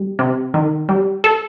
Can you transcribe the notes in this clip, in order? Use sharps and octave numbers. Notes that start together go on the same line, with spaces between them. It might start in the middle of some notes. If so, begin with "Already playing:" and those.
Already playing: G3
C3
D#3
G3
A4